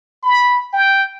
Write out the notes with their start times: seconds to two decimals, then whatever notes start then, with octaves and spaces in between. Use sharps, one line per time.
0.23 B5
0.73 G5